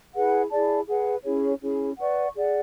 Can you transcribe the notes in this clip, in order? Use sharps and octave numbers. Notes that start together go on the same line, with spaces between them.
E4 G#4 B4 F#5
E4 G#4 D5 A5
G#4 B4 F#5
C#4 E4 G#4 C#5
C#4 E4 G#4
B4 D5 F#5 C#6
G#4 D5 F#5